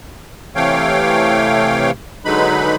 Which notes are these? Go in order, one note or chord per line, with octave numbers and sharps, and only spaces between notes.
C3 E3 A3 C#5 F5 G5
D3 F#3 G#3 D#4 B4 B5